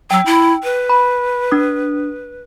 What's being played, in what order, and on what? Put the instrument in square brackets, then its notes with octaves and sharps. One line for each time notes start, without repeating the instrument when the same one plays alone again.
[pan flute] F#3 [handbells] G5 E6
[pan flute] E4
B4
[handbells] B5
D4 D#6